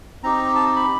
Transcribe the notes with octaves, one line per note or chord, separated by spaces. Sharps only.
C4 D#4 G4 A#5
A5
B5